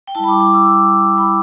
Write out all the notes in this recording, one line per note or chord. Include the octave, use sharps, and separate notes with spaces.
G5
G3 E4 A5
B5
D6
D6
E6
G3 E4 D6
G3 E4 B5